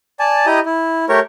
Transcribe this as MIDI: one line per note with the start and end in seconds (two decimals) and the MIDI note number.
0.19 0.46 74
0.19 0.46 80
0.19 0.46 81
0.46 0.60 64
0.46 0.60 67
0.46 0.60 75
0.46 0.60 82
0.46 0.60 87
0.65 1.05 64
1.09 1.19 57
1.09 1.19 67
1.09 1.19 70
1.09 1.19 73